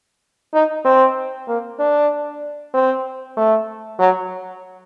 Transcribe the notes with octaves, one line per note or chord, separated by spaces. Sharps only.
D#4
C4
A#3
D4
C4
A3
F#3